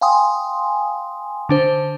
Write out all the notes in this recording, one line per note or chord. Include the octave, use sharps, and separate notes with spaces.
F5 G5 G#5 C6 D#6
D3 D4 C5